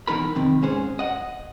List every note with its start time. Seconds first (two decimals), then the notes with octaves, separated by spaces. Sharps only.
0.07 B2 E3 D#4 A#4 B5
0.35 F2 C3 D#3
0.62 G#2 C#4 G#4 C5
0.99 D#5 F#5